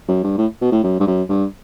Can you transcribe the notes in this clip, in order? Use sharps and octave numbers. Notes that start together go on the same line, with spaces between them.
F#2
G2
A2
B2
A2
F#2
G2
F#2
G2